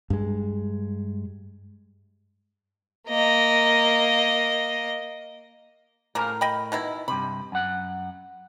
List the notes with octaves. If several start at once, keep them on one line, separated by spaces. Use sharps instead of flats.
G2 G#3
A#3 D#5
A2 C#3 F3 A#3 A#4 A#5
D#5 G5 B5
B2 D#3 E4
G2 C3 B5
F#2 F#5